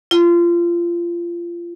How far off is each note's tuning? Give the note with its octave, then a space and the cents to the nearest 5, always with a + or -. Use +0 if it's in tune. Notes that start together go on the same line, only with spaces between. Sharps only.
F4 -25